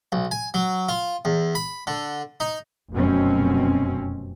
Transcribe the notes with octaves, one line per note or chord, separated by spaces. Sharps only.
B1
G#5
F#3
F4
E2
B5
D3
D#4
F1 F#2 B2 C4 C#4